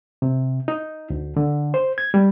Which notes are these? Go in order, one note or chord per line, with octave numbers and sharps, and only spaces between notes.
C3
D#4
D2
D3
C5
G#6
G3